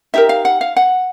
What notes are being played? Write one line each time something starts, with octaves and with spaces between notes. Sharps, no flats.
D#4 G4 A#4 E5
F5
F#5
F5
F#5